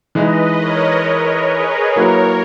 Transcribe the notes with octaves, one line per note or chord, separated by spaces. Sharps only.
E3 G#3 D#4 B4 D#5
A#4 C#5
A#4 C#5
G#4 B4
F#3 A#3 E4 A#4 B4 C#5